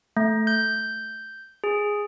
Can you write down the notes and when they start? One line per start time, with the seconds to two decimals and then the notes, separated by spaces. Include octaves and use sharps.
0.17 A3
0.47 G6
1.64 G#4